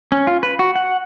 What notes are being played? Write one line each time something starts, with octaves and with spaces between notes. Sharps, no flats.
C#4
F4
B4
F#4
F#5